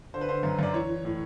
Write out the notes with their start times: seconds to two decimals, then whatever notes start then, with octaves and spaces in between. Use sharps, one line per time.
0.14 D3 C5
0.21 B4
0.29 D3 C5
0.43 F#2
0.59 F#2 D5
0.74 E3 C#5
0.89 E3
1.05 A2